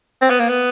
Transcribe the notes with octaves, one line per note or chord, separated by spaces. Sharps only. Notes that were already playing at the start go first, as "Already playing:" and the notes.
C4
B3
A#3
B3